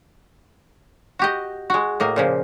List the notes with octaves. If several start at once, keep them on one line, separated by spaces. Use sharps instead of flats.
F#4 G4 D#5
G#3 F#4
A2 A#3 D#5
A#2 C#3 F3